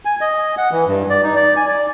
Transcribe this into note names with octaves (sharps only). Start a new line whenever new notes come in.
G#5
D#5
F#5
E3
G2
D5
D#4
D5
G#5
D5